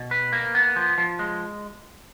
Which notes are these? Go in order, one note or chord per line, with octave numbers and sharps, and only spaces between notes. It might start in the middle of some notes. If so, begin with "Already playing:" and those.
Already playing: B2
B4
A#3
B3
F3
F3
G#3